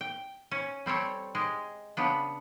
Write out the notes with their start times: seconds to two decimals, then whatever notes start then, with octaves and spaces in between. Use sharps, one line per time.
0.01 G5
0.51 C#4
0.86 G3 C4 A4 C#5
1.35 G#3 G4
1.97 C#3 B3 D4